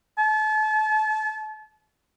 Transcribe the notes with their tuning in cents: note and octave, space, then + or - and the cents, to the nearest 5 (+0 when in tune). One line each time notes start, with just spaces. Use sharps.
A5 -35